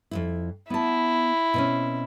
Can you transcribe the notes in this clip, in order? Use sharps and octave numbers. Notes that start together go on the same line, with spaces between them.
F2 G#2 E4
B3 E4 A5
B2 C4 C#4